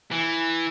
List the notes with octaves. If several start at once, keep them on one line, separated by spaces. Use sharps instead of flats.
E3